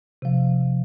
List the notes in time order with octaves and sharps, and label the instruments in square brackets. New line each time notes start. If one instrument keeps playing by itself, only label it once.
[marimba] C3 F3